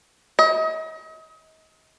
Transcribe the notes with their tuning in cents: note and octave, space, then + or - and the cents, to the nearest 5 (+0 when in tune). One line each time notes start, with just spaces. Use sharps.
D#5 +35